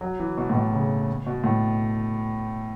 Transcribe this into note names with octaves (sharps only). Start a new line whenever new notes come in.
F#3
E3
B2
A2
B2
C#3
B2
A2